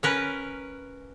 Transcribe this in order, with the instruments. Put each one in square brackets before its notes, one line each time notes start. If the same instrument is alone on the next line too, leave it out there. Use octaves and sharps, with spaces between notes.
[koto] C#4 A#4 B4